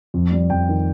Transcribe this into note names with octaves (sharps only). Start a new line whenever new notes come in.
F2
G3
F2 G5
D#3